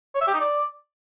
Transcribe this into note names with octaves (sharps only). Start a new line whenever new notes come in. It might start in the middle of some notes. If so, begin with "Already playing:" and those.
C#5
E5
G4
D#4
D5